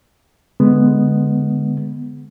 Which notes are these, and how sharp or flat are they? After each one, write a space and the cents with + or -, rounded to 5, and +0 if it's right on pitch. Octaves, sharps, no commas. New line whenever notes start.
D3 +0 G#3 +0 B3 +0